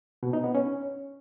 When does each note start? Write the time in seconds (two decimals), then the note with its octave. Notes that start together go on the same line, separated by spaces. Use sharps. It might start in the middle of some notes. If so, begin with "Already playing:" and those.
0.23 B2
0.33 D#4
0.44 B3
0.55 C#4